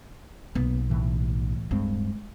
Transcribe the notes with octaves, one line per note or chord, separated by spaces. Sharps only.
B1 A#3 B3
A2 E3
D1 G2 G#3 C4